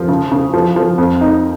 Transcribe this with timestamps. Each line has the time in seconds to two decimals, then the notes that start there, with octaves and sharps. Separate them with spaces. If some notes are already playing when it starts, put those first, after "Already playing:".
Already playing: F3
0.08 C#3
0.32 C#3
0.53 F3
0.76 F3
0.98 F2
1.21 D#4